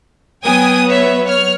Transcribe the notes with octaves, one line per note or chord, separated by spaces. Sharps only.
F#3 B3 G5 G#5 D#6
B4 C#5 E5
C#5 F6